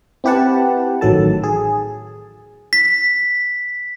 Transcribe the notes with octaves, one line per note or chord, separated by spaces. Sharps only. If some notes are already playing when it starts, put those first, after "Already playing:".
C4 E4 G4 B4 F#5 A5
A1 D#3 F#3 A4 A5
G#4
B6